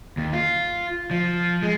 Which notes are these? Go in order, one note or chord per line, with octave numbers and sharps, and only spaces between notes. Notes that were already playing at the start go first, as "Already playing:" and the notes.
D#2
F4
F3
G#3